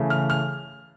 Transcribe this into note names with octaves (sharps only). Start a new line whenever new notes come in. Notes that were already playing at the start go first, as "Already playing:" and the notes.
Already playing: C#3 E3 A3
F6
F6